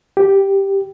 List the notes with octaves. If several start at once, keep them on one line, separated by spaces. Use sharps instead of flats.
G4